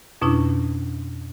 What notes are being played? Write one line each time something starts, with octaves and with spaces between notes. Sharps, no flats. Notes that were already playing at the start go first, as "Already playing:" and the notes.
F2 B2 C#4 D4 E4